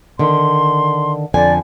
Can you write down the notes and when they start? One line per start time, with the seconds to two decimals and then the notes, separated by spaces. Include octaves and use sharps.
0.19 D3 D#3 C6
1.34 F2 D3 D5 G#5